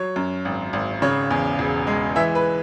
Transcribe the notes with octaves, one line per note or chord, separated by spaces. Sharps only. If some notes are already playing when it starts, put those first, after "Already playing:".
Already playing: F#3 C#5
F#2
G#1
G#1
C#3 C#5
E2
E1
G#3
E3 E5
B4